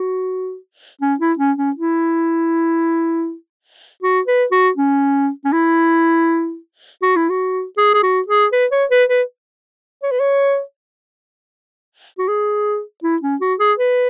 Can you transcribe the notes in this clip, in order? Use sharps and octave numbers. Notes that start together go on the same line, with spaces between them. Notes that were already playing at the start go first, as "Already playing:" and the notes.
Already playing: F#4
C#4
E4
C#4
C#4
E4
F#4
B4
F#4
C#4
C#4
E4
F#4
E4
F#4
G#4
G#4
F#4
G#4
B4
C#5
B4
B4
C#5
B4
C#5
F#4
G#4
E4
C#4
F#4
G#4
B4